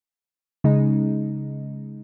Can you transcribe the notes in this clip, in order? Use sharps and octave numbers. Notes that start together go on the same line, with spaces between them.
C#3 G#3 D#4